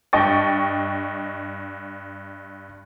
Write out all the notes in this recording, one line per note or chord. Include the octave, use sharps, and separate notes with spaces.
G2 D#5 G5 C#6 A6